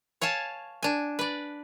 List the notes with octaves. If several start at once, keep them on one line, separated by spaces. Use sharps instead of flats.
C#5 F5 G#5 A5
D4 G#5
B4 D5